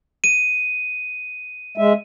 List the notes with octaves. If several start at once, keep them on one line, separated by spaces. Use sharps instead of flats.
D#7
G#3 E5